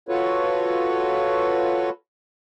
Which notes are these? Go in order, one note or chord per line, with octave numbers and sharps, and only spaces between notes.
F4 F#4 A4 B4 C#5